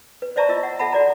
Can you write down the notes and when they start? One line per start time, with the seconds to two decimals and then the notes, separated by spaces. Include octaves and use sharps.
0.22 B4
0.36 C5 D5 E5 A5 A#5 C#6
0.49 F4 D#5 E6
0.63 F#5
0.79 A4 E5 F#5 A5 B5
0.92 F#4 D5 A#5